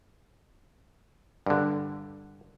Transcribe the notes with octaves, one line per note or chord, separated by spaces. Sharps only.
G2 D3